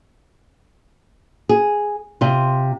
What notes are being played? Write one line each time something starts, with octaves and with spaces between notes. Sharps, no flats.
G#4
C3 F4